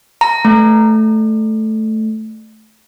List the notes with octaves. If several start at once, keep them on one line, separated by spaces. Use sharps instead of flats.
A#5
A3